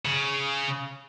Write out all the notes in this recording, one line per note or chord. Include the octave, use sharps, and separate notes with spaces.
C#3